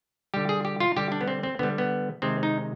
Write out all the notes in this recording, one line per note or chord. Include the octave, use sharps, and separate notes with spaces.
D3 G3 G4
G#4
G4
F4
D3 G3 G4
D4
B3
C4
C4
D3 G3 B3
B3
C3 D#3 G#3 C4
D#4